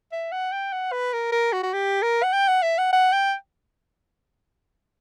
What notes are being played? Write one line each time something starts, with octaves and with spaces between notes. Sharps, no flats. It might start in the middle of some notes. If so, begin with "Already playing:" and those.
E5
F#5
G5
F#5
B4
A#4
A#4
F#4
F#4
G4
A#4
F#5
G5
F#5
E5
F#5
F#5
G5